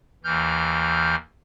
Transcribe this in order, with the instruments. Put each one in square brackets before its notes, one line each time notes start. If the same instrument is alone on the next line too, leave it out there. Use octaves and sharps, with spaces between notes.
[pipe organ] D#2 E3 F6 G6